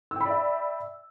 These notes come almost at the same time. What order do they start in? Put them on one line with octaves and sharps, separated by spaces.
E6 G5 B5 D5 E5